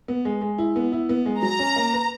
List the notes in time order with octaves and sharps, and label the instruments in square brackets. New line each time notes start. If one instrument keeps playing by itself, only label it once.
[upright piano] B3
G#3
G#3
E4
B3
E4
B3
G#3
[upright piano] F#3 [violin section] A#5
[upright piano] C#4
A#3
B4